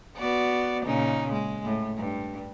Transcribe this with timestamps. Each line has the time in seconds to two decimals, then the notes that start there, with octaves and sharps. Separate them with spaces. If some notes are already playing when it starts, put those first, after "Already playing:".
0.17 B3 F#4 D5
0.85 A#2 C#3 D#4
1.32 G#3
1.65 A2
1.97 G2